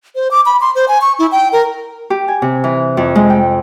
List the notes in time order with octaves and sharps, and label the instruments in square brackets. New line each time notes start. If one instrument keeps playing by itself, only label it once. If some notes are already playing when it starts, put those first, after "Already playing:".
[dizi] C5
D6
B5
C6
C5
G#5
C#6
E4
G5
A#4
[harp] G4
G#5
C3
E3
F2
G#3
G5